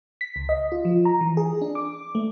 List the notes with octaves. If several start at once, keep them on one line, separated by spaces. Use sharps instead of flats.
B6
C#2
D#5
F4
F3
A#5
E3
G#4
D4
D6
A3